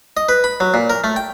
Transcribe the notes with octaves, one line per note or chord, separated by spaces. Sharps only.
D#5
B4
B5
F#3
A#2
A#4
A3
G5